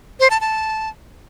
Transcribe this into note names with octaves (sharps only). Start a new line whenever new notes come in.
C5
A5
A5